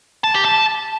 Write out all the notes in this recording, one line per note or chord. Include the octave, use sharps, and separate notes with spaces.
A5
G4
A5